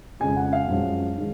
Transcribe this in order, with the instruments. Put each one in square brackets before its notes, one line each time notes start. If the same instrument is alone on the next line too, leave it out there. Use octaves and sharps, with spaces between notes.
[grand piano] F2 C#3 G#3 G#5
F#5
F5
F#2 F3 G#3 C#4
D#3 G#3